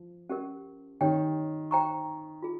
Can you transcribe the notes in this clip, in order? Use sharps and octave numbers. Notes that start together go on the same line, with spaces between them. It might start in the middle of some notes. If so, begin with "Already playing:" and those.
Already playing: F3
C#4 G4 A#4
D#3 G4 C#5 G5
C5 G5 A#5 C#6
F4 G#4